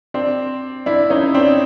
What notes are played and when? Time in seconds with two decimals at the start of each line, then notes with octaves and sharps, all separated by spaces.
0.14 C4 D4
0.86 D4 E4
1.10 C#4 D#4
1.34 C4 D4